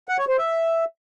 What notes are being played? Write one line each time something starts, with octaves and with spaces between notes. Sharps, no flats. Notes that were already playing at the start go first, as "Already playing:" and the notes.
F#5
C#5
C5
E5